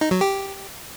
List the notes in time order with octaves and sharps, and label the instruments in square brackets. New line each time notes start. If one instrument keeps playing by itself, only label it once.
[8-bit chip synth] D#4
F#3
G4